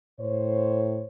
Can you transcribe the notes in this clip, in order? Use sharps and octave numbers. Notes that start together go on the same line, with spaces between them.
A2 C5 C#5